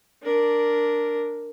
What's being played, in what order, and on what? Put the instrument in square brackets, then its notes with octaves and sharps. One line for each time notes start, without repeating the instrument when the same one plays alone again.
[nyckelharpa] D4 A#4